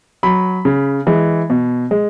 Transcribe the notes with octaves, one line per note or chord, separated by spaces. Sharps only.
F#3 B5
C#3
E3 G#3
B2
G#3